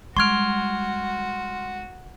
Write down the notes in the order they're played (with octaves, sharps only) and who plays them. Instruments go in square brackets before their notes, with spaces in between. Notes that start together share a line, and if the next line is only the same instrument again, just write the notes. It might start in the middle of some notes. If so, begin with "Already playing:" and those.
[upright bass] G3 G#3 [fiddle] F#4 [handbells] C6 F6 [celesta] C#6 G#6 D7